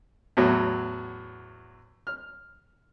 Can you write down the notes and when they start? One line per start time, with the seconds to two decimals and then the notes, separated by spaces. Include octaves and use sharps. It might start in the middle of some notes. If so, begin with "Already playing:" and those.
0.37 E2 A2 F#3
2.07 F6